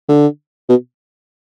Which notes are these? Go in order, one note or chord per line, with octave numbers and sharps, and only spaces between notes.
D3
B2